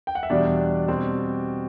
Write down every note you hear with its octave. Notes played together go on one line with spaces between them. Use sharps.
G5
F#5
E5
E2 B2 G3 D4 D5
B2 G3 C4